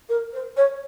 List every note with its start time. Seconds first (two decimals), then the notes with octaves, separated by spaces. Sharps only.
0.09 A#4
0.33 C5
0.56 C#5